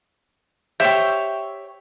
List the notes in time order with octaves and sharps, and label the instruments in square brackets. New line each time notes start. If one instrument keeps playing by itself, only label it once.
[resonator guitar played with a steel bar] G4 C5 E5 [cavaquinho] C#5 G5